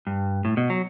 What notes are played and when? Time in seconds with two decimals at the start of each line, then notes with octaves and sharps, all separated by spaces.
0.07 G2
0.45 A2
0.57 B2
0.70 F#3